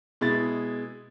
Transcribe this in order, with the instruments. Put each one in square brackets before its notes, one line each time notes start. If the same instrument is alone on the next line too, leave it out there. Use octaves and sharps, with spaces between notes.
[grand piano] B2 G#3 E4 A6